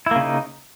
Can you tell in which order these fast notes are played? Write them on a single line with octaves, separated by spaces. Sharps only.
E4 A#3 C#3 D#4